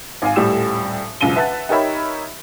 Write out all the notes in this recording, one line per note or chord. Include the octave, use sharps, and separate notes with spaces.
G#1 F5 G#5
D#1 A2 G3 G4 E6 E7
E1 C#2 F#2 D#7 G7
B4 E5 F#5 A5 F#6 A6
D#4 G4 A#4 C#5 E5 B5